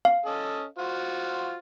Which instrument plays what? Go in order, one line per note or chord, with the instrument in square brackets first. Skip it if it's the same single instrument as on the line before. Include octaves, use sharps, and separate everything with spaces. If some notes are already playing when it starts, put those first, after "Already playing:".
[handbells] F5
[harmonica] C#4 A4 D#5
F4 F#4 C5